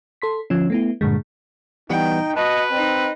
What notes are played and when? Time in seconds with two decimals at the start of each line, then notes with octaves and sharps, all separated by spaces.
0.22 A4 C6 B6
0.50 D3 F3 C#4
0.70 A3 B3 E4
1.01 G2 A#2 D3 G#3
1.90 E3 G3 B3 D#4 G5
2.37 F#4 B4 D#5 A5
2.71 C4 D#4 D#5